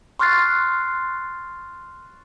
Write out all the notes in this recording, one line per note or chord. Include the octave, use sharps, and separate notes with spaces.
C6 C#6 F6 F#6 A6 C7